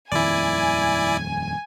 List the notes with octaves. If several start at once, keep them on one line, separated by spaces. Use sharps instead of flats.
D#1 F2 D#3 E4 D5 G#5